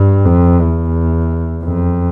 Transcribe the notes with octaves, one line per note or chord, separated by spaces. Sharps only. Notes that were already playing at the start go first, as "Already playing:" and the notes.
Already playing: G2
F2
E2
F2